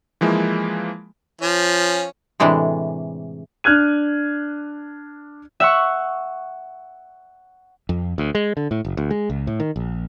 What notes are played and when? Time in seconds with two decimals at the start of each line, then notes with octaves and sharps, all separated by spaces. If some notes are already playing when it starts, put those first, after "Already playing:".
0.21 E3 F3 G#3 A#3 E4
1.41 F3 C#4
2.40 A2 C3 E3 G#3 D4
3.64 D4 F6 F#6 G#6 D#7
5.60 E5 F#5 C#6
7.89 F2
8.18 D2
8.35 G#3
8.57 D3
8.71 A2
8.85 F#1
8.97 D2
9.10 G#3
9.30 C#2
9.47 A2
9.60 D#3
9.76 A#1